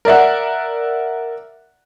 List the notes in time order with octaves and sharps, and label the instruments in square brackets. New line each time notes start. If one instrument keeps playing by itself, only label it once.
[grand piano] A#4 D5 E5 F#5